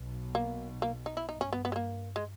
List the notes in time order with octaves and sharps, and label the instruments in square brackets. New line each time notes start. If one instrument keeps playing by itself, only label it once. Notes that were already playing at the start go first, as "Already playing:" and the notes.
Already playing: [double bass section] B1 B2
[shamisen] A#3
A#3
D#4
E4
[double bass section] G2 [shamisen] D#4
[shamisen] C#4
B3
B3
G#3
A#3
G#3